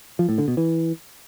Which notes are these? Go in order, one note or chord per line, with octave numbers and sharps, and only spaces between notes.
F3
A2
D3
B2
E3